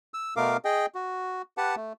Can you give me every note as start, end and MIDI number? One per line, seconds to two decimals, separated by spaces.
0.14 0.34 88
0.36 0.57 47
0.36 0.57 57
0.36 0.57 59
0.36 0.57 70
0.36 0.57 77
0.36 0.57 86
0.65 0.86 68
0.65 0.86 75
0.65 0.86 79
0.95 1.42 66
1.57 1.76 67
1.57 1.76 71
1.57 1.76 78
1.57 1.76 81
1.76 1.93 57